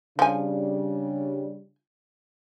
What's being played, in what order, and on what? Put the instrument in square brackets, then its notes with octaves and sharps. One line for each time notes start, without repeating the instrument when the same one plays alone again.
[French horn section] C#3 G3 D4 [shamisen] F3 G#5